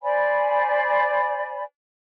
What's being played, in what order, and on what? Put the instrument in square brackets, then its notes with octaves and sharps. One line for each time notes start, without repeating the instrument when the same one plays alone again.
[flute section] C5 D5 G#5 B5